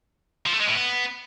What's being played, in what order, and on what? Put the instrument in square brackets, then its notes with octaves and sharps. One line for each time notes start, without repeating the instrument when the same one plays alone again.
[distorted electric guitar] F3
A3
G#3
A2
B3